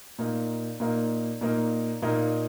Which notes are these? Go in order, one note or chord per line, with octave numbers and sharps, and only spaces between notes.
A#2 A#3 D#4
A#2 A#3 D#4
A#2 A#3 D#4
A#2 A#3 D#4